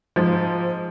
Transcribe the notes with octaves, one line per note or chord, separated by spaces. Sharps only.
G#2 F3